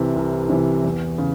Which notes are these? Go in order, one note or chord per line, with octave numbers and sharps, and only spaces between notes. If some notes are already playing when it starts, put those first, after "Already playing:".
Already playing: C2 C3 E3
C2
C3 E3
E2
C#3